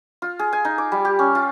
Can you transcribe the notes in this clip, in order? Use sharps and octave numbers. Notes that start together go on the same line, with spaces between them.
F4
G#4
G#5
D#4
D6
G3
G4
C#4
F4